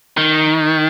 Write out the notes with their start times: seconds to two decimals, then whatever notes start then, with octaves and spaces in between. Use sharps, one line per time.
0.17 D#3